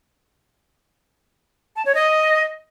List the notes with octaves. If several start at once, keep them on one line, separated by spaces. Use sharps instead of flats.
A5
C#5
D#5